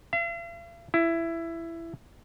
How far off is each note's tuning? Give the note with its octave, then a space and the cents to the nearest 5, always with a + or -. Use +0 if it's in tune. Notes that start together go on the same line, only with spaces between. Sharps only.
F5 -45
E4 +15